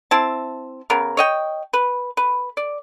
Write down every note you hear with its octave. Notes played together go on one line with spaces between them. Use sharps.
C4 E4 A5
C#3 B3 A#4
C#5 D#5 G5
B4
B4
D5